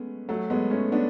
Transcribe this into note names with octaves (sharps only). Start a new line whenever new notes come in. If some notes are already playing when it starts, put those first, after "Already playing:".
Already playing: G#3 A3 B3 C#4
F#3 A3
G#3 B3
A3 C#4
B3 D4